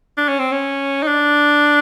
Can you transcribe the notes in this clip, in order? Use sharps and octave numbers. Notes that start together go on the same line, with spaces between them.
D4
C#4
C4
C#4
D#4
D4